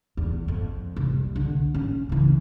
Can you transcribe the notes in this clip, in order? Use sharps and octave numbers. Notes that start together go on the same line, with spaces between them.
E2
F2
C2
D3
C#4
C#3 E3